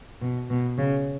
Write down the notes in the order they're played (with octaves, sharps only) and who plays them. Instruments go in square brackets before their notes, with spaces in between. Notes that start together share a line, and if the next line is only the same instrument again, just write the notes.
[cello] B2
B2
C#3